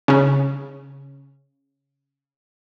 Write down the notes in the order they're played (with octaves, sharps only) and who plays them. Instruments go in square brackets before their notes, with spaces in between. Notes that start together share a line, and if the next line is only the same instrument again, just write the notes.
[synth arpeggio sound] C#3 C#4